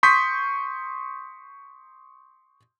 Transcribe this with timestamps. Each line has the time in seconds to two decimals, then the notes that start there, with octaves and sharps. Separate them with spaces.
0.03 C6 C#6 D#6 G6 B6